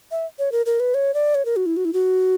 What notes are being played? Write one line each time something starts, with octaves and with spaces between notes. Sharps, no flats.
E5
C#5
A#4
A#4
B4
C#5
D5
C#5
A#4
F#4
E4
F#4
E4
F#4